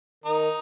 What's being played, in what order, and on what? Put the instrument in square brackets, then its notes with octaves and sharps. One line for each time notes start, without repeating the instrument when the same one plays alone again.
[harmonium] D#3 [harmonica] D#4